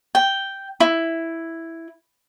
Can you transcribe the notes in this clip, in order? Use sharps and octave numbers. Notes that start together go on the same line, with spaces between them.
G5
E4